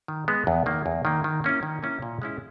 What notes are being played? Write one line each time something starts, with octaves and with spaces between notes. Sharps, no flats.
D#3
G#3 B3
E2
D#3 A#3
E2
D#3 A#3
D#3
A#3 C#4 E4
D#3
A#3 C#4 E4
A#2
G#3 C#4 E4